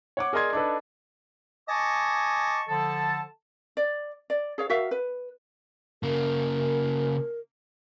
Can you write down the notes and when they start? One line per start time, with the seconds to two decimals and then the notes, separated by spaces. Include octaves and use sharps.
0.17 C#5 F#5 D6
0.33 G#4 A#4 D5 D#5 C6 G#6
0.53 D4 D#4 A4 B4
1.68 D#5 G#5 A5 C#6 D6
2.68 D3 F3 A4 A5
3.77 D5
4.30 D5
4.58 G#4 C#5 F5
4.70 F#4 A#4 E5 F5
4.91 B4
6.03 C#3 A#3 A#4